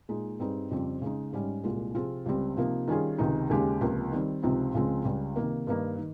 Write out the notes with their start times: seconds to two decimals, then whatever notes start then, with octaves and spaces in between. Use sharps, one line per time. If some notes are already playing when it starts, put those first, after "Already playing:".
0.09 A#2 G#3 D#4 G#4
0.39 G2 G3 C4 D#4 G#4
0.71 F2 C#3 G3 C4 G4
1.02 C#3 G#3 D#4
1.33 G#2 G3 C#4
1.64 C2 A#2 G#3
1.94 C3 F3 C4 F4 G#4
2.26 C#2 C#3 G3 C4 G4
2.57 C3 F3 A#3 D#4
2.88 D#3 G3 C#4 F4 G#4
3.18 C#2 C3 D#3 G#3 D#4
3.50 D#2 C#3 G#3 C#4 G4
3.81 C#2 C3 F3 A#3
4.12 D#3 G3 C4
4.43 C#2 C3 F3 C4 D#4
4.74 C#2 C#3 F3 G#3 C4
5.05 C#2 C#3 G3
5.36 C3 D#3 A#3
5.67 G2 D#3 A#3 D#4
5.98 D#3